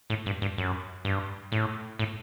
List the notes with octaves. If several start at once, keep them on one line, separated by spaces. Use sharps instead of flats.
A2
G2
G2
F#2
G2
A2
A2